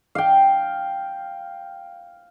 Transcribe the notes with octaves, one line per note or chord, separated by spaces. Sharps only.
F5 G5